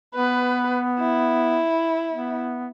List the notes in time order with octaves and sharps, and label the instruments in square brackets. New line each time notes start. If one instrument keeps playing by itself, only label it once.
[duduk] B3 [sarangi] B4
[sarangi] E4
[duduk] B3